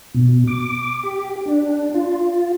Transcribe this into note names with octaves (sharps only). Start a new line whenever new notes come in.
B2
D6
G4
D4
F4